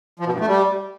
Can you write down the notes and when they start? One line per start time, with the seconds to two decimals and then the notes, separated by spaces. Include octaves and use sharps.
0.19 F3
0.26 B2
0.33 G2
0.40 A3
0.47 G3